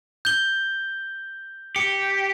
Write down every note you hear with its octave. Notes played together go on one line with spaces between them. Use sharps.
G6 G7
G4 C#7